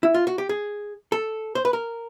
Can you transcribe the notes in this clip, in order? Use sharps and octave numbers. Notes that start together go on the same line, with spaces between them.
E4
F4
F#4
G4
G#4
A4
C5
B4
A#4